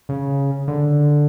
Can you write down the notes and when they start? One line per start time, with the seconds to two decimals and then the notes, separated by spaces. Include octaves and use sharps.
0.09 C#3
0.68 D3